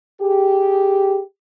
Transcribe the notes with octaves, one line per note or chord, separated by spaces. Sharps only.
G4 G#4